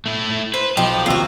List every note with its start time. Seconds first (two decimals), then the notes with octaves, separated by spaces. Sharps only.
0.06 A3 E4
0.54 B4 C5
0.77 B1 F3 G4 D#5
1.06 D#2 C3 F4 F#4 E6